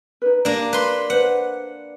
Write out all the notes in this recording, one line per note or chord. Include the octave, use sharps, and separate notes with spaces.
D#4 B4
A#3 D4 G4 D5
B4 C6
B4 C5 F#5